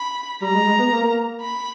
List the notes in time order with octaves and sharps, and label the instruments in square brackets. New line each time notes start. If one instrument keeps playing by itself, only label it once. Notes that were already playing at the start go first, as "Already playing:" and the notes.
Already playing: [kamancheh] B5
[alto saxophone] G3 [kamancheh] A#5
[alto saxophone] G#3
G#3
B3
A#3
[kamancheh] B5